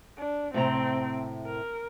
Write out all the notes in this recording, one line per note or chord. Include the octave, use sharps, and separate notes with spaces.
D4
A2 C3 C4 A#5
A#4